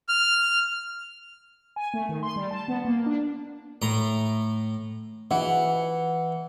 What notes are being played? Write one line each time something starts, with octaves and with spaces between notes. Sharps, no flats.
F6
G#5
A3
D#3
C6
G3
A5
B3
A#3
D4
A2 A#5
E3 F#5